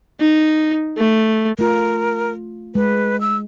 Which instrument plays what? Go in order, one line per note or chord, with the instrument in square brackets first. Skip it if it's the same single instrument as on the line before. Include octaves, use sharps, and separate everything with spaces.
[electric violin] D#4
A3
[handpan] A3 F4 [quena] A#4
[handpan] G#3 [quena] B4
[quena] E6